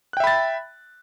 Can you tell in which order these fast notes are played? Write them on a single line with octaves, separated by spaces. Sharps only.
F#6 G5 E5 B5 A6